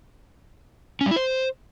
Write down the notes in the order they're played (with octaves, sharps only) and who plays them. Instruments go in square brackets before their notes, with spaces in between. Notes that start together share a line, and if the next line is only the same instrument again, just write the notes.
[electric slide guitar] C#4
G3
E4
C5